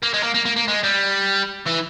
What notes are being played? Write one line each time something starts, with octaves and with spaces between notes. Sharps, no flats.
A#3
G#3
A#3
A#3
A#3
A#3
G#3
G3
E3